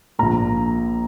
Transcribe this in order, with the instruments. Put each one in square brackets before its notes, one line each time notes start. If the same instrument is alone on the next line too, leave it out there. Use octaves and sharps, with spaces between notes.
[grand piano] A#1 A#2 A#5